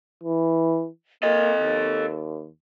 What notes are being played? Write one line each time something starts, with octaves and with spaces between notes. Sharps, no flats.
E3
A#3 A4 D#5
D#2